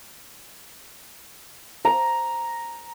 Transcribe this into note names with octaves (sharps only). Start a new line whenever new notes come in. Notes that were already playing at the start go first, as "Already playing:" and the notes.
A#5